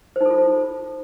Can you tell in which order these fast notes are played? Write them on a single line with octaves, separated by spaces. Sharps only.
C5 D#4 A4 F4